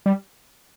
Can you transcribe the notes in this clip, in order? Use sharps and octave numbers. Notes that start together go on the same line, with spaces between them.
G3